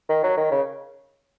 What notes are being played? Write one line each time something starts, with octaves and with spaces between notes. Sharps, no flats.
D#3
F#3
D#3
C#3